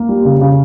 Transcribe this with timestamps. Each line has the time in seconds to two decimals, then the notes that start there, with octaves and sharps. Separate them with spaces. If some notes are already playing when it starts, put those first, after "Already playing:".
Already playing: A#3
0.09 G3
0.25 C#3
0.41 C#3